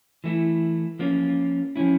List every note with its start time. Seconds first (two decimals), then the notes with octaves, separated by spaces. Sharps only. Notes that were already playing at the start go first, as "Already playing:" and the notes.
0.24 E3 A3 E4
0.99 F3 A#3 C#4 F4
1.76 F3 C#4 E4